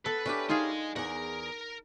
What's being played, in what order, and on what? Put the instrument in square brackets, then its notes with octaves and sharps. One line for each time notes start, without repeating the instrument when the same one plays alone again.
[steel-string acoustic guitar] B3 [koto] A4 [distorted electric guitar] B4
[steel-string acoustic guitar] C#4 E4 G4 [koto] D4
[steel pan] D#4 [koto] F4 G#4 [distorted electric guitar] D#5 G#5
[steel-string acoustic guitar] E2 G#4 [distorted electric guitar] A#4 [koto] F#5